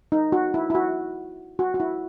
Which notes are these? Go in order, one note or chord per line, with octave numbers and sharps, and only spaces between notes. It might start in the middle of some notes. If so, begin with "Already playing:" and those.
D#4
F#4
E4
E4
F#4
F#4
F#4
E4